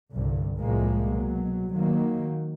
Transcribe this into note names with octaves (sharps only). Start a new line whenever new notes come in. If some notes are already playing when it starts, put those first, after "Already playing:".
C2 G2 D3
C2 A2 F3 G#3 A#3
B2 F#3
D#3 F#3 A#3